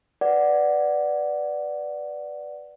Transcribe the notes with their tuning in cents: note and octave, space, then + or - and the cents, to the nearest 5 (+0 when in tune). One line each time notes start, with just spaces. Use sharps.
B4 +0 D5 +0 F#5 +0